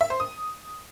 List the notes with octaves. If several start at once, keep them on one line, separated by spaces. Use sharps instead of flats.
E5
C5
D#6